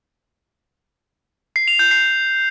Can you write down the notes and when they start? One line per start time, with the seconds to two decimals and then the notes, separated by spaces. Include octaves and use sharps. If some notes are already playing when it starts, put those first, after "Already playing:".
1.56 C7
1.68 F7
1.79 G6
1.91 C7